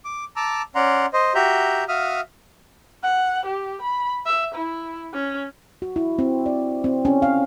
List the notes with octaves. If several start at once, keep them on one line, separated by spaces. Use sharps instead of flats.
D6
A5 A#5 D6 E6
C#4 D5 F#5 A#5 C6
C5 D#5
F#4 G4 E5 A#5 G6
F#4 E5 F5 D#6 F6
F#5
G4
B5
E5
E4
C#4
F#4
E4
C4
D5
C4
C#4
F5